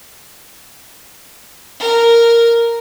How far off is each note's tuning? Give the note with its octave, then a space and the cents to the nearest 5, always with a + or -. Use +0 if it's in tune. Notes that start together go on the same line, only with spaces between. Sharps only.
A#4 -5